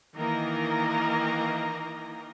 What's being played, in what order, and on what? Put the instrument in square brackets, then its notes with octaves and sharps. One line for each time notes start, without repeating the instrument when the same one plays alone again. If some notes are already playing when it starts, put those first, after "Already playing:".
[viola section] D#3 E3 A#3 A#4 D#5 A#5